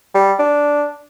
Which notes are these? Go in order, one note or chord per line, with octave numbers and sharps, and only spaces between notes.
G3
D4